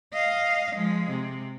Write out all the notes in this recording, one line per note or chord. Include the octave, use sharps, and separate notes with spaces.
D#5 F5
F3 G#3
C3